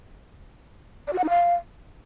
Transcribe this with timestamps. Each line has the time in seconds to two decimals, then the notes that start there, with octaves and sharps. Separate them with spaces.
1.07 D5
1.13 F#4
1.18 F#5
1.24 D#4
1.29 F5